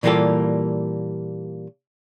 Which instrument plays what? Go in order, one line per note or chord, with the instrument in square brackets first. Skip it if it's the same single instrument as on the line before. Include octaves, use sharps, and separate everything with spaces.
[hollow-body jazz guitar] A#2 E3 G3 A#3 F4 A4